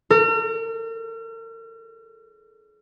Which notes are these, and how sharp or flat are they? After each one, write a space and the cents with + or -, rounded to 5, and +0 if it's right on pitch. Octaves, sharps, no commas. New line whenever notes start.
A#4 -45